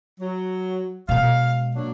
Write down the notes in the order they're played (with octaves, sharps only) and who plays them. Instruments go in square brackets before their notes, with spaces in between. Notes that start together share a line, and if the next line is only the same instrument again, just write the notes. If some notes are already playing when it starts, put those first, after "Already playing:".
[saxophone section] F#3
[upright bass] B2 G#3 [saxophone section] F5
[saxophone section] F#3 A#3 D4